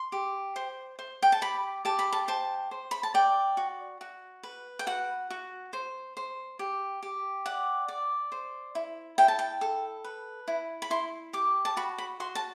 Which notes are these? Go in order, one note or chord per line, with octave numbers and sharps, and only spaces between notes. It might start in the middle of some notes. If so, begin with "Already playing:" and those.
Already playing: C6
G4
C5
C5
G5
A5
G4 B5
G4 A5
B5
A5
C5 A5
C5
B5
A5
D5 G5
F#4
F#4
B4
G5
F#4 F#5
F#4
C5
C5
G4
G4
D5 F#5
D5
C5
E4
E4 G5
A5
G5
A4
B4
E4
B5
E4 C6
G4 D6
A5
F#4 B5
B5
F#4 C6
A5